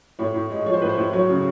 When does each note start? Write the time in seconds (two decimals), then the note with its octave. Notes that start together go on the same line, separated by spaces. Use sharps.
0.19 A2 C#5
0.34 A2
0.50 G#3
0.66 F3 C#5
0.74 C5
0.82 A2 B4
0.89 C5
0.98 A2
1.13 F#3 C#5
1.29 C#3